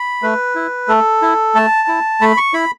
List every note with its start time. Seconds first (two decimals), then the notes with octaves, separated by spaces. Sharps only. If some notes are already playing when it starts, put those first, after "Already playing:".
Already playing: B5
0.23 A3 B4
0.55 E4
0.88 A3 A4
1.22 E4
1.55 A3 A5
1.88 E4
2.21 A3 B5
2.37 C#6
2.53 E4 B5